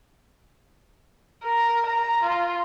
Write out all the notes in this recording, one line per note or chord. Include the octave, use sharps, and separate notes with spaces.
A#4
A#5
F4